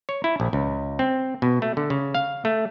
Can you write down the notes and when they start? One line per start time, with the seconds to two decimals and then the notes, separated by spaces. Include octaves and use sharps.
0.09 C#5
0.24 E4
0.40 A#1
0.53 C#2
0.99 C4
1.42 B2
1.62 A3
1.77 D3
1.90 C#3
2.15 F5
2.45 A3